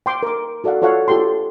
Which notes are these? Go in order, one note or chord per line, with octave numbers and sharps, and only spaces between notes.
G5 C6 D6
A#4 D6
F#4 A4 D5 F5 F#5
F4 A4 C#5 F5 F#5
F4 G4 A4 G5 C6